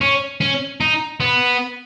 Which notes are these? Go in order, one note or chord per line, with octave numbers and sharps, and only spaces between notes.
C#4
C#4
D#4
B3